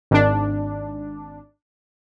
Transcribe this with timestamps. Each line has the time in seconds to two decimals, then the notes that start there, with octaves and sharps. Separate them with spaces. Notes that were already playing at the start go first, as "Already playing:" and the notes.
0.11 G#1 D4